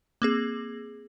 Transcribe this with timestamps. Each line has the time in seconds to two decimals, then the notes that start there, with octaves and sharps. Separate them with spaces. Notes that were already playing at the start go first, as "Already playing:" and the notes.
0.22 A#3 C4 G#4